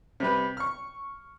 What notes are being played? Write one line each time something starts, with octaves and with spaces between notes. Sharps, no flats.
C3 G3 B4
C#6 F6